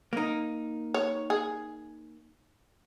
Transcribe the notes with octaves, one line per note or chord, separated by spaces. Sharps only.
A#3 D#4
C#5
G#4